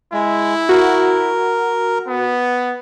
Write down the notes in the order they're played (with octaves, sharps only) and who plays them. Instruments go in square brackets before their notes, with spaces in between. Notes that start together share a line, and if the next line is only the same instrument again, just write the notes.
[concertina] G#3 [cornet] E4
[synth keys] F#4 [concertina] A#4
[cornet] B3